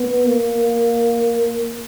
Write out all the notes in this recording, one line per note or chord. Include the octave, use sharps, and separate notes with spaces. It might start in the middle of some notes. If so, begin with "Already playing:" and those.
Already playing: B3
A#3